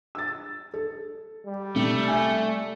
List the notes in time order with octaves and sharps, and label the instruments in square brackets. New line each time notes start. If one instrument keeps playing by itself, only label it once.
[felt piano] E6 A6
A4
[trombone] G3
[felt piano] C3 [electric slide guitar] A3
[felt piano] E5 G#5